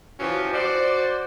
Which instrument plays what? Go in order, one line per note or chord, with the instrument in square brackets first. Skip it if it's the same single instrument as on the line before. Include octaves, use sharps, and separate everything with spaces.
[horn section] E3 F3 C#4 F#4 G4
F#4 C5 D5